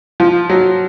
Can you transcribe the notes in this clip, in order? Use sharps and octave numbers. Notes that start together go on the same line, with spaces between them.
F3
F#3